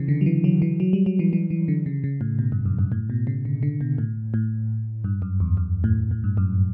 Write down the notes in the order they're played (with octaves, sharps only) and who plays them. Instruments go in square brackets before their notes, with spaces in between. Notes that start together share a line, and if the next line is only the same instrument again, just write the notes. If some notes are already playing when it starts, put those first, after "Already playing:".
Already playing: [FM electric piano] C#3 E3
D3
F#3
E3
F#3
E3
F#3
G3
F#3
E3
E3
E3
D3
C#3
C#3
A2
B2
G2
F#2
G2
A2
B2
C#3
D3
D3
B2
A2
A2
G2
F#2
E2
F#2
A2
A2
G2
F#2